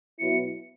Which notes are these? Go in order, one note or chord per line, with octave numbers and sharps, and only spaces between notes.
B2 F#3 B3 E4 C#7